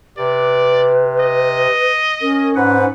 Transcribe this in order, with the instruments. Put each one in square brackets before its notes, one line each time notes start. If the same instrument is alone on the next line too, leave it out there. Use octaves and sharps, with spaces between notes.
[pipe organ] C3 [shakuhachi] B4 [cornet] D5
[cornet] D#5
[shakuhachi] C#4 [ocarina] A#4
[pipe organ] G#2 B4 F#5 [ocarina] C5